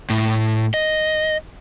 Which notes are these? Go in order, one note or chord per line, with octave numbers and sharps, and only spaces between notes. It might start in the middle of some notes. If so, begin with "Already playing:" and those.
A2
D#5